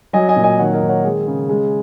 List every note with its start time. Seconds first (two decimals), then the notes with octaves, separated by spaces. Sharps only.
0.13 F#3 D#5 G#5
0.29 D#5 G#5
0.36 A#2
0.44 D#5 G#5
0.59 D#3 C#5 F#5
0.73 A#4 D#5
0.82 D#3
0.89 C#5 F#5
1.04 G#3 G#4
1.27 C#3
1.49 G#3